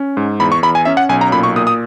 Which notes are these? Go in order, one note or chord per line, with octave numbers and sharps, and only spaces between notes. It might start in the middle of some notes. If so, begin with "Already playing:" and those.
Already playing: C#4
G#2
E2 B5
C#6
E2 B5
G#5
C#4 E5
F#5
B1 G#5
A#5
A#2 B5
C#6
A#2 D#6
D#6